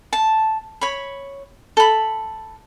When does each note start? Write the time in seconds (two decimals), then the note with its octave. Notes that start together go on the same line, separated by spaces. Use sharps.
0.13 A5
0.81 C#5 B5
1.77 A4 B5